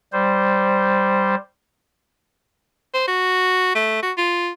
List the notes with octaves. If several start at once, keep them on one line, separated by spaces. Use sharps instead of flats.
G3 C5
C5
F#4
A3
F#4
F4